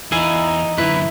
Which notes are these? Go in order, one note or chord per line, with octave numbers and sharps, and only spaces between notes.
E2 D#4 E4 F5 G#5
F#2 D3 E4 B4